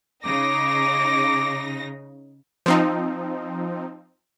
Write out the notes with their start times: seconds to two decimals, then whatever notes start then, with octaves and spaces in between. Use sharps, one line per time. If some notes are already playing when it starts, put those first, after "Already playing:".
0.24 C#3 D#4 D6 A#6
2.66 F3 C4 D#4